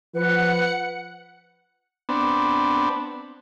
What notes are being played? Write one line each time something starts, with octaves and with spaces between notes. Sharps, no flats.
F3 B4 F#5 C#7
B3 C4 D4